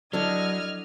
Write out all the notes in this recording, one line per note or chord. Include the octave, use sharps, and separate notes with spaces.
D3 F#3 D4 E4 D#5 F6 G#6